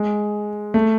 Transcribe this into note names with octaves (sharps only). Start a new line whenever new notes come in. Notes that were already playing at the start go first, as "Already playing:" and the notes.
Already playing: G#3
A3